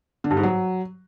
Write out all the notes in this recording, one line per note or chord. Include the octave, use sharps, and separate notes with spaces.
D3
G2
G#2
F#3